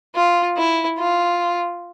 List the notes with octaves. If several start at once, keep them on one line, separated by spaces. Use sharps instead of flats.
F4
E4
F4